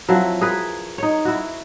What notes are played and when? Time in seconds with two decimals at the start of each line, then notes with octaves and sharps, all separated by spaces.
0.08 F3 F#3 C4 E4
0.41 G#4 A#4 B4
0.98 D#4 C#5
1.25 E4 F#4